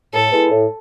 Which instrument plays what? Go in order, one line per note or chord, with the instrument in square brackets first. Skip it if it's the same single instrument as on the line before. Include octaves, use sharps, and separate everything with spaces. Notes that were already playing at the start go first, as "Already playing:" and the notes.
[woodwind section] A2 [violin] A4
[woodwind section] G#3 B3 E4
A2